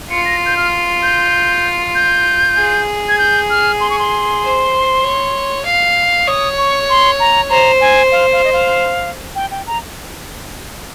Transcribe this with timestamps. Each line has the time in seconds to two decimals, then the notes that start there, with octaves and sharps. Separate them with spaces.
0.10 F4 C#7
0.25 A#6
0.46 G6
0.57 F6
1.03 G6
1.95 G6
2.57 G#4
3.09 G#6
3.18 G6
3.50 F6
3.80 C6
3.90 C#6
3.99 C6
4.42 C5
5.04 C#5
5.65 F5
6.27 C#5 D#6
6.58 C#6
6.89 C6
7.20 A#5
7.50 C5 A#5
7.81 G#5
8.12 F5
8.32 F5
8.44 D#5
8.53 F5
9.35 G5
9.51 G5
9.67 A#5